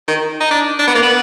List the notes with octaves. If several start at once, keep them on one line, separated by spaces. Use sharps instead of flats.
D#3
D#4
D4
D4
B3
A#3
B3